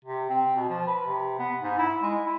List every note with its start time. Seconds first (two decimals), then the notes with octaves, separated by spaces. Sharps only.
0.05 C3
0.29 C4
0.56 B2
0.69 F3
0.87 B4
1.06 C3
1.39 B3
1.61 G#2
1.78 E4
2.02 G#3
2.25 E4